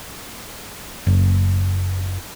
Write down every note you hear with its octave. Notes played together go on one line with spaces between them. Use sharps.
F#1